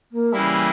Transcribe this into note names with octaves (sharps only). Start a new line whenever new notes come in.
A#3
C#3 E3 G3 A#3 E4